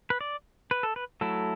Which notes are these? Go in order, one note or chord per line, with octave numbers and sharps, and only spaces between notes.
B4
D5
B4
A4
B4
F#3 A3 E4 A4